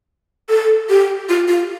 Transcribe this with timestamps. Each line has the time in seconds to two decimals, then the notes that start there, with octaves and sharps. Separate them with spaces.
0.49 A4
0.89 G4
1.29 F4
1.48 F4